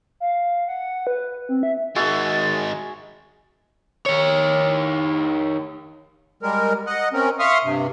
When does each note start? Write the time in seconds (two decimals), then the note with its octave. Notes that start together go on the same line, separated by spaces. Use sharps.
0.20 F5
0.68 F#5
1.07 B4
1.49 C4
1.63 E5
1.96 D#3 G#3 F#4 G#4 E5 A6
4.06 D#3 C#5
6.43 G3 G#3 A#4
6.87 D#5 F#5
7.13 C4 C#4 A#4
7.39 E5 F5 C6 C#6 D#6 F6
7.64 G2 C3